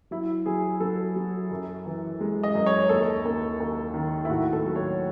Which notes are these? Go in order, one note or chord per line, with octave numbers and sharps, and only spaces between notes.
F#3 E4
F#3 G#4
F#3 A4
F#3
F#2
E3
G#3
D#5
F#2
C#5
D#2 A4
D#2
D#2
D#3
E4
A2 F#4
A4
F#3
C#5